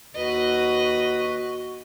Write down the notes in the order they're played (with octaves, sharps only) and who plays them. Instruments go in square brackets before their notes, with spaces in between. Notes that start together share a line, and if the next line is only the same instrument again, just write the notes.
[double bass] D#2 [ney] F#4 [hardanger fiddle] B4 D#5